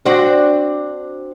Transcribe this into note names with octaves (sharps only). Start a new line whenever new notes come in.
C4 D4 F#4